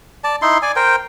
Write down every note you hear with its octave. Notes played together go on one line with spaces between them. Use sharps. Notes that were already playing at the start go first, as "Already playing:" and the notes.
D5 A5
D#4 E4 C6
D5 G#5
A#4 C5 G5